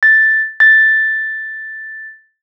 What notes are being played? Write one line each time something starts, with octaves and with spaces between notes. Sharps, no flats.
A6
A6